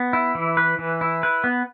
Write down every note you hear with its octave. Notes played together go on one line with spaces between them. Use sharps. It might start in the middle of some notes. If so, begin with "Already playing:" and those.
Already playing: B3
E4
E3
B4
E3
E4
B4
B3